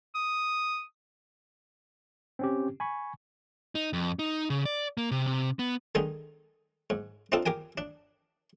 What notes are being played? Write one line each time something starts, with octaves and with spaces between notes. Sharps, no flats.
D#6
C4 C#4 G4
G#5 B5 C#6
D#4
F2
D#4
C#3
D5
A#3
C3
C3
B3
D3 D#3 G#3 D#4
G#2
C4 D4 D#4 F4 A4
G4 A#4 G5 G#5
D4